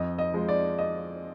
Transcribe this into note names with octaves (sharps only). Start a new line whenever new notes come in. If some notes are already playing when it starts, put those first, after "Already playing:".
Already playing: F2 D#5
D#5
F3 G#3
D5
D#5